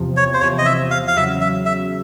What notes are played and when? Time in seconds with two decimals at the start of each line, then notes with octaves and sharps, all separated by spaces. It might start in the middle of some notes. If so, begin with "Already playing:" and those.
Already playing: E2 C3 F3
0.17 C#5
0.34 C5
0.41 E2 C3 F3 C#5
0.58 D#5
0.66 E5
0.91 F5
1.08 F5
1.16 E2 C#3 F#3 E5
1.41 E5
1.66 E5